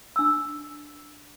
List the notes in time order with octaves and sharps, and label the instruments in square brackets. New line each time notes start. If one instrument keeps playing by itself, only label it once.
[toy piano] D4 E6